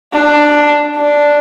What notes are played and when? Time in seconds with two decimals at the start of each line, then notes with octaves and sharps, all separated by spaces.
0.13 D4
0.95 D4